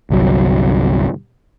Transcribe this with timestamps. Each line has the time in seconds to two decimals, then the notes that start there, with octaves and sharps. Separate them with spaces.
0.10 G1 C2 F#3